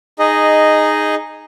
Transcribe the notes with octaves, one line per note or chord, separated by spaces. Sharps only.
D#4 G#4 D#5